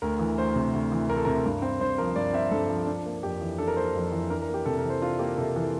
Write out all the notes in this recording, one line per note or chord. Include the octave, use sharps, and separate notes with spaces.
D2 A#4
E3
D2 C5
C3
D2
E3
D2 A#4
A4
C3 A#4
G2
C4
G2 C5
F3 A#4
G2 D5
C4 E5
G2 A4
F3
D4
A#3
F2 G4
E3
D4 A4
A#4
A#3 C5
A#4
F2
E3
D4 A#4
A#4
A#3
G4
C3 A4
A#4
E3
C5
D4 F4
A#3 G4
C3 A4
E3 A4